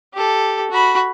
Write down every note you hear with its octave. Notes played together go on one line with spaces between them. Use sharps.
G4 A4
F#4 B5